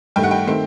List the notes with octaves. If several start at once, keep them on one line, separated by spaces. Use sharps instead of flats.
G2 D#3 A3 G5
F#5
G5
D#3 A3 C4